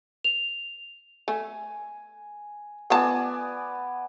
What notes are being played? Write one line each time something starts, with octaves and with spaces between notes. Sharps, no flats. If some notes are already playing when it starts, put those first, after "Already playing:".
F7
A3 G#5
A3 B3 F4 D5 G#5 A5